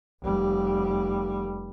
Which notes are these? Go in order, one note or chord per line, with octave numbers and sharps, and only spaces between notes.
F1 G3